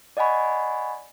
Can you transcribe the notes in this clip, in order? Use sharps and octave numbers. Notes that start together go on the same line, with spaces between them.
D5 D#5 F#5 G#5 B5 C#6